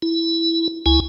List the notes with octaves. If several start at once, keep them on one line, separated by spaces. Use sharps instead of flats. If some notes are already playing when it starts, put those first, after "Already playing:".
E4
C#2 E4 G#5